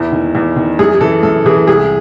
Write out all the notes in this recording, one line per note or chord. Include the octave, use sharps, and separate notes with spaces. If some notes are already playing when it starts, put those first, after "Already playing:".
Already playing: E2 E4
D#3
E2
D#3
F#2 G#4
G#4
E3 A4
F#2 A4
E3 G#4
C2 G#4